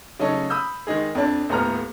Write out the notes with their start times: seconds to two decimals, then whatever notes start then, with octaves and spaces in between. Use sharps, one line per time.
0.19 C#3 F#3 A3 C#4 D#4 A4
0.50 B5 D#6 E6 G6
0.87 D#3 G#3 D#4 G#4
1.15 F2 D4
1.49 D#1 A2 B3 A#5 F6